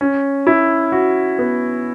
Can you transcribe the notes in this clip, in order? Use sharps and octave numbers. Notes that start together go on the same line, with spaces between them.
C#4
E4
F#4
B3